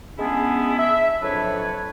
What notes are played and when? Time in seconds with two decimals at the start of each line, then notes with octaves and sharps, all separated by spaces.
0.19 G#3 B3 C#4 D4 E4 G#4
0.79 E5
1.22 F2 A2 F#3 D4 B4 C#5